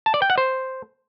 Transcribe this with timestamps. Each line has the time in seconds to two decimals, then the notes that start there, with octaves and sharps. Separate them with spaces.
0.06 A5
0.14 D5
0.22 G5
0.30 F#5
0.38 C5